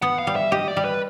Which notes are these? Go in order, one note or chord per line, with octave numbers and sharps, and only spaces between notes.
B3 F#5
F5
G3
E5
G4 D#5
D5
G3
B4